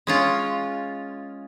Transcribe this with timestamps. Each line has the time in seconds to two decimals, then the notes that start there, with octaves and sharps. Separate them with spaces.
0.07 G#3 C#4 F4